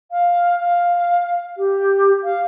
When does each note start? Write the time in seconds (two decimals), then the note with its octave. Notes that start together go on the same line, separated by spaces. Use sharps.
0.11 F5
0.59 F5
1.58 G4
2.24 F5